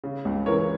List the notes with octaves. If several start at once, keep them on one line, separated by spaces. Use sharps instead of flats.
C#3
C#2
E3 A#4 C#5